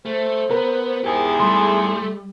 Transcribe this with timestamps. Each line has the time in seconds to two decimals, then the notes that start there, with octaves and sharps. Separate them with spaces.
0.05 A3 C5
0.51 B3 A#4
1.04 E2 G#2 G4 G#4
1.40 G3 A3 C6